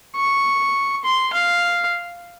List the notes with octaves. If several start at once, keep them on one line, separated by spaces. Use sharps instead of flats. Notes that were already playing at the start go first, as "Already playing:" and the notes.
C#6
C6
F5